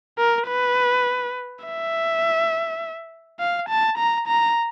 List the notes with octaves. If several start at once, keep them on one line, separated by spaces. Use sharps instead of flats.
A#4
B4
E5
F5
A5
A#5
A#5